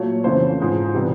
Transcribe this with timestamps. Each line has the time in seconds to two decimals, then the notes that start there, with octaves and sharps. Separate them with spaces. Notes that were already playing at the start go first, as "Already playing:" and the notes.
Already playing: A#2 F#3 A3 C#5
0.24 F2 C#3 E3 A3 C5
0.60 G#2 F3 G#3
0.94 C3 E3 G3 B3